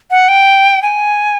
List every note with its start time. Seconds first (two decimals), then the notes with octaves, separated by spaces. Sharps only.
0.11 F#5
0.28 G5
0.82 G#5